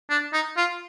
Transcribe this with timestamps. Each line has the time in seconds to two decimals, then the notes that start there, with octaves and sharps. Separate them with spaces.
0.10 D4
0.33 D#4
0.57 F4